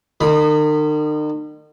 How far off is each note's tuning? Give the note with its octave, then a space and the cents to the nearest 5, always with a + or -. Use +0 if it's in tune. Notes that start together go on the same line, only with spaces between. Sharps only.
D#3 -45 B5 +0 D#6 -25